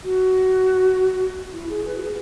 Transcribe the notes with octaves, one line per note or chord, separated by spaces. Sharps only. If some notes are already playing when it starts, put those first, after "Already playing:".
F#4
E4
G#4
B4
F#4
G#4